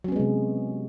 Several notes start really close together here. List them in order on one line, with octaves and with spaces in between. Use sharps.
F#3 C#4 B3 G#3 C3